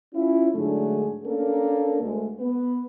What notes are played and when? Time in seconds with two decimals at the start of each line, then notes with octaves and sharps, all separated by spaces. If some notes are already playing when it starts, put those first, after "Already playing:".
0.14 C#4 E4 F4
0.55 G#2 D3 F#3 A3 D4 G#4
1.25 A#3 C#4 D4 A4 A#4
2.02 D2 G#3
2.40 B3 B4